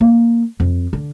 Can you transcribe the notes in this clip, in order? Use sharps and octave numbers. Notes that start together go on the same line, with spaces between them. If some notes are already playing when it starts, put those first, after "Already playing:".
A#3
F2
D3